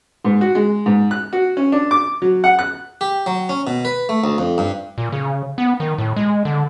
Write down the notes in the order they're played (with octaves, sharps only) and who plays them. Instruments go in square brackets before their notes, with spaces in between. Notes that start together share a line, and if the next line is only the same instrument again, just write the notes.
[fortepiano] G#2
F#4
G#3
G#2
F#6
F#4
C#4
D4
D6
F#3
F#5
F#6
[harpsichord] G4
F#3
C#4
B2
B4
A3
D2
F2
G2
[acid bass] A#2
C#3
B3
D#3
A2
G#3
D3